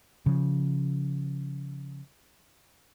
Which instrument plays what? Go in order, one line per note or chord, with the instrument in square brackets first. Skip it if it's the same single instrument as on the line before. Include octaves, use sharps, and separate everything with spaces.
[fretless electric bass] C#3 F3